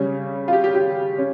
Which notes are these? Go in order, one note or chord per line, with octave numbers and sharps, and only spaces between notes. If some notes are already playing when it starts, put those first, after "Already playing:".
Already playing: C#3 G3 C#4
F4
G4
G4
G4
C#4